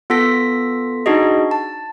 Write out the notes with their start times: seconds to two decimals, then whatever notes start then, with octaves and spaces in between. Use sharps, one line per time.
0.10 B3 F4 A4 A#6 B6
1.06 D4 D#4 F#4 G#4 D#5
1.51 A5